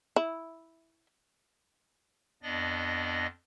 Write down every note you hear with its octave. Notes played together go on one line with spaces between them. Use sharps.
E4
F2 B3 D4 D5 D#5 A#6